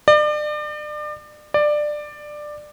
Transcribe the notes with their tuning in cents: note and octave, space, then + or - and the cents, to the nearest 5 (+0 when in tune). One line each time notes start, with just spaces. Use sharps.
D5 +35
D5 +15